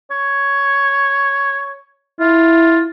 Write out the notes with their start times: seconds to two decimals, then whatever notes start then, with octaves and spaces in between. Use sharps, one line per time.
0.11 C#5
2.20 E4 F4